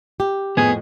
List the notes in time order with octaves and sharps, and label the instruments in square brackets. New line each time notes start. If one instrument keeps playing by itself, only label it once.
[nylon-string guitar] G4
[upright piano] F2 A2 F3 [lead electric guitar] B3 [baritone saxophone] G#4